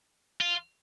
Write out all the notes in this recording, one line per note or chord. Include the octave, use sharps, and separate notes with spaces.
F4